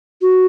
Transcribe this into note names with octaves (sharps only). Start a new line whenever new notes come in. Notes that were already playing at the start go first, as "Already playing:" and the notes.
F#4